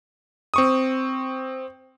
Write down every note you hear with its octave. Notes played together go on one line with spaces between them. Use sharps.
C4 C#6 D#6